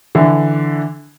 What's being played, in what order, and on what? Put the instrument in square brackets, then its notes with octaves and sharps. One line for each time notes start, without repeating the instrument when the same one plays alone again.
[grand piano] D3 E3